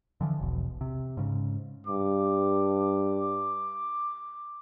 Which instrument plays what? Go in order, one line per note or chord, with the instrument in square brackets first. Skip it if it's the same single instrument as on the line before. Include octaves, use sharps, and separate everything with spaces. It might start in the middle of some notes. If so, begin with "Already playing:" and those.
[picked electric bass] D3 E3 F3
E1 B1
C3
G#2 C#3
[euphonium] G2 [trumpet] D6